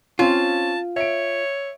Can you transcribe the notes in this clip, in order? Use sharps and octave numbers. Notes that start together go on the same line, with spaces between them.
C4 C#4 F4 A5
C#5 E5 D7